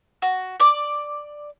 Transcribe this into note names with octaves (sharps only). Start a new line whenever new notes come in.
F#4
D5 D6